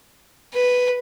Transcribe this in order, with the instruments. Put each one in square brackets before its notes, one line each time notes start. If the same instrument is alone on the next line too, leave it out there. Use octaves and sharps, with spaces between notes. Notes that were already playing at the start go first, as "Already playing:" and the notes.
[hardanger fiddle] B4